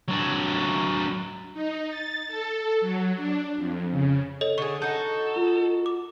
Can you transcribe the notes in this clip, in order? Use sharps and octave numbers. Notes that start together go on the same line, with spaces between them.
F#3 D4
D#4
A6
A4
F#3
D4
F2
C#3
A4 C#5 D#5
D3 G#4 C#6
D#4 F#4 A4 G6
F4
D6